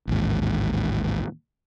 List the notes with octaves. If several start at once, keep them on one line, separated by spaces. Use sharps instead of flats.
A1 D#2 G#2